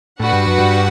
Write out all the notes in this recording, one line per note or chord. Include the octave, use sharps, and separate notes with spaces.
A2 D4 F#4 B4 F#5
G2
F#2
G2